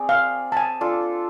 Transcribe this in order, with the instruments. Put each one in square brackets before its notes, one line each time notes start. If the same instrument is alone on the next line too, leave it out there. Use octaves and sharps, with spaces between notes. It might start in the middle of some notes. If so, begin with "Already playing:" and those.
Already playing: [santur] C4 G#4 D5
[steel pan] F5
A5
G#5
[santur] D4 F4 A4